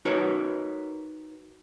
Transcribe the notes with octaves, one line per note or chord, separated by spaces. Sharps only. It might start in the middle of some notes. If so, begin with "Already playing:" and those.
D#4 F#4 A#4 B4 C#5